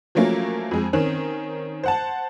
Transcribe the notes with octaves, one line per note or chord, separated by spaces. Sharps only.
F3 F#3 A3 A#3 C#4
F2 G#3
D#3 C4 C#4
C5 F#5 A5